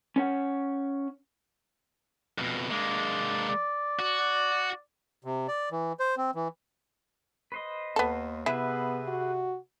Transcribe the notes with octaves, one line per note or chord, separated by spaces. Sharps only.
C#4 C#5 F#5
F2 B2
G#3 A#3 D4
D5
F#4
C3
D5
E3
C5
C4
E3
B4 C5 D#5
D#2 B3 A4
C3 B3 E4 G#4 B4 E5
F#4